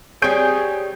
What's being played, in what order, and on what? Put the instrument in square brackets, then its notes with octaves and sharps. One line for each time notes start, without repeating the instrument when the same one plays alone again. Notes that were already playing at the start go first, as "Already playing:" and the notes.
[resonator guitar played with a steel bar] G3 C4 [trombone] G#4 [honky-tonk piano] C#5 G6 D7